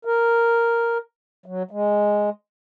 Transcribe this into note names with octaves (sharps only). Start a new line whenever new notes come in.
A#4
F#3
G#3